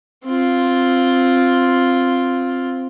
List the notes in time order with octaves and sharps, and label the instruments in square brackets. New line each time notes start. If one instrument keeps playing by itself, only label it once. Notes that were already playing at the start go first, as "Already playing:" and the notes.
[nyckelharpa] C4 F4